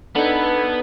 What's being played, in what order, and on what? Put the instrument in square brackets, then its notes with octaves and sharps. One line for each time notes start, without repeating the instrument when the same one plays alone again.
[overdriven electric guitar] B3 [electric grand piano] D4 D#4 [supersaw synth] A4 B4 G#6